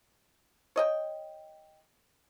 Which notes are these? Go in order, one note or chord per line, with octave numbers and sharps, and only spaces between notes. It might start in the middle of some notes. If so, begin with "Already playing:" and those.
C#5 D#5 G5